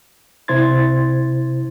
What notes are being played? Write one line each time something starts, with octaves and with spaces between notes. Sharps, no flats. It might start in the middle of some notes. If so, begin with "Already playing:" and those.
C3 E4 C5 C6 G#6 A6